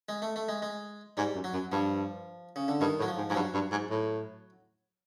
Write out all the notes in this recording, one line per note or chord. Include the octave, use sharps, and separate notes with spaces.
G#3
A3
A3
G#3
G#3
G#2 G3
F#2
F#3
F#2
G2 F3
C#3
D3
G2 D#3
A2
F#3
F3
G#2
G#2 F3
G2 F#3
G2
G#2
A2